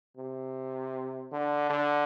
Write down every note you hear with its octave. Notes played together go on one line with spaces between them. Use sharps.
C3
D3
D3